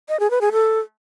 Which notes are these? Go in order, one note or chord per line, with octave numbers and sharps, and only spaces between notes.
D#5
G#4
B4
G#4
A4